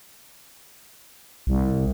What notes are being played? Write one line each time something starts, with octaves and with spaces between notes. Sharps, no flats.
C2